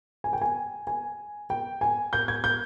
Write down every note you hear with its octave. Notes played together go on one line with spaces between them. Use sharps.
G#5
G5
G#5
G#5
G5
G#5
G6
G#6
G6